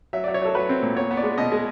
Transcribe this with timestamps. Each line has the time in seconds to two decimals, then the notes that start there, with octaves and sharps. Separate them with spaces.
0.13 F#3 E5
0.24 F#3 D5
0.34 C#5
0.42 F#3 A4
0.55 F#3 B4
0.69 C4
0.82 A#2
0.96 B3 C#5
1.11 B3
1.17 D5
1.24 G#3
1.38 B2 D#5
1.52 G#3